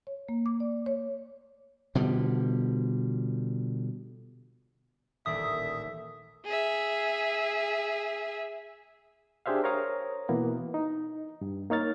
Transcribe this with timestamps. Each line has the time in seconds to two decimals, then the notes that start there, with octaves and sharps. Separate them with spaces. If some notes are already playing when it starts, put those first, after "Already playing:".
0.07 C#5
0.29 A#3
0.46 D6
0.60 D5
0.86 C#5
1.95 B2 D3 F3 G3
5.26 D#1 A1 D5 E5 D#6
6.46 G#4 E5
9.46 D4 G4 G#4 C5 E5 F5
9.64 A#4 C5 C#5 F5 A#5 D#6
10.29 B2 E3 A#3 B3
10.74 D#4
11.41 G2
11.70 A#3 D#4 C#5 F6 A6